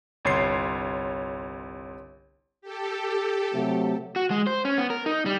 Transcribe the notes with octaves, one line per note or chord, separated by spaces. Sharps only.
G1 C2 C#5 C6 C7
G4 A4
C3 F#3 A3
F#4
G#3
C5
C#4
B3
A#4
D#4
G3